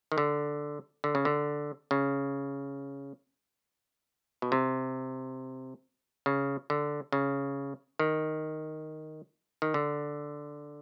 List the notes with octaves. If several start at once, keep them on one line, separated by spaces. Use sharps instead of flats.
D#3
D3
D3
C#3
D3
C#3
B2
C3
C#3
D3
C#3
D#3
D#3
D3